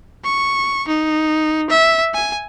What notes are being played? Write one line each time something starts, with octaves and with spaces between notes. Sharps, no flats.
C#6
D#4
E5
G#5